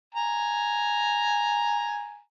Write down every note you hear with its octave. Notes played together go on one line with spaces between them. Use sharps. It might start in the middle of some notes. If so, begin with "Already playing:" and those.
G#5 A#5